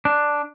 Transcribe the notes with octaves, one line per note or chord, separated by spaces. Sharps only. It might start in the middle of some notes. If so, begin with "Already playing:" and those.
D4